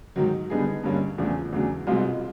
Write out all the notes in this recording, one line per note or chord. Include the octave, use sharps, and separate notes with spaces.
G#2 D#3 F#3
D3 G3 B3 D#4 G#4
G2 D3 G3 A#3 C#4
E2 C#3 F3 A3 D4
E2 C#3 F#3 A3 D4
C2 B2 G#3 C4 F4